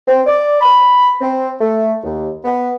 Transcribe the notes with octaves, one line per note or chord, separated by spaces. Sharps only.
C4
D5
B5
C4
A3
D#2
B3